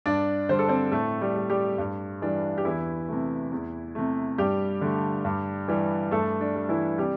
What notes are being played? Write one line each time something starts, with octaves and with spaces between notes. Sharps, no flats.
G2 D4 D5
D3 G3 C5
A4
C4 C5
A2 A3 A4
G3 G4
G3
G3 G4
G2
E3 G3 D4
G4
E2 E3 E4
C3 A3
E2
C3 A3
G2 G3 G4
D3 A3
G2
E3 G3
G2 A3 A4
D4
G3
E3 E4
C3 G3 G4